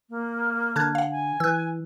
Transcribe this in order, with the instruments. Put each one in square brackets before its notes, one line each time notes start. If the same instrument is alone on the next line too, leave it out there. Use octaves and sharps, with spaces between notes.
[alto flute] A#3
[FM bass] D3 [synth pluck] A5 F#6 G#6
[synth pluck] F5 F#5
[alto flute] G#5
[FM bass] E3 [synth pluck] E6 F#6